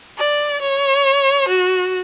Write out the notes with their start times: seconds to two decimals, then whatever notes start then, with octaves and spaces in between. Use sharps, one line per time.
0.19 D5
0.62 C#5
1.48 F#4